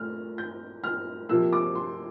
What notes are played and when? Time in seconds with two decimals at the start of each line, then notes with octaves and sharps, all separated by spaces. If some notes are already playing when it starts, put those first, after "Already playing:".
Already playing: A#2 A3 F6
0.38 G6
0.84 F6
1.29 C3 F3 A#3 E6
1.53 D6
1.75 C6